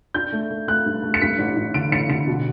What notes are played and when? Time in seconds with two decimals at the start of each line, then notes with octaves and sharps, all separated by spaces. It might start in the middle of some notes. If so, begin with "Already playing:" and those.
0.14 D4 G6
0.32 A3
0.50 A3
0.68 A3 F#6
0.86 G2
1.03 A3
1.14 C#7
1.22 G2 B6
1.39 A1
1.57 A1
1.74 D3 D7
1.92 A1 C#7
2.09 D3 C#7
2.27 B2